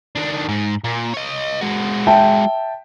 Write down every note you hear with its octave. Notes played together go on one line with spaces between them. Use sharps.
D#3 D4
G#2
A#2
C#5 D#5
G#3 F#4
E5 G5 A5